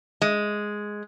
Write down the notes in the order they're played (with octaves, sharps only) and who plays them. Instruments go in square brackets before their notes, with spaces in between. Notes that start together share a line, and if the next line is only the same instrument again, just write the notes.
[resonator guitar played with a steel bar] G#3